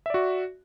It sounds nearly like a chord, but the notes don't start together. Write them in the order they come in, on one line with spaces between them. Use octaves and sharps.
E5 D5 F#4